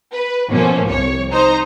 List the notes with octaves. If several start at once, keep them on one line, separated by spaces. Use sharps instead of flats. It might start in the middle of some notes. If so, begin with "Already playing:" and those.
B4
B2 F3 A3 A#3 C#4
C2 C#5
D#4 C5 A#5